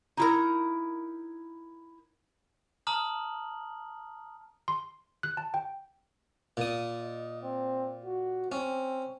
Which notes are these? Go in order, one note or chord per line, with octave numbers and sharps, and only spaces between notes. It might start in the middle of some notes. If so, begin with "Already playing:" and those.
D#4 E4 A#4
A5 A#5 D#6 F6 F#7
C6
F#6
A5
G5
A#2 D#6
D#5
C4
F#4
C4 C#4